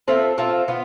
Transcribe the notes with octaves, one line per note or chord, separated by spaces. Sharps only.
C4 F4 A4 E5
C4 F4 A4 E5
B3 F4